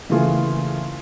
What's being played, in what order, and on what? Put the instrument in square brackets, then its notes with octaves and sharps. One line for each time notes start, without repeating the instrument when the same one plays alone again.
[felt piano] C#3 E3 A3 A#3 F4 G#4